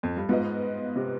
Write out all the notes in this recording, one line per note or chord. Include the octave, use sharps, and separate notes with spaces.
F2
G2
G#2 B3 F4 B4 D#5
C3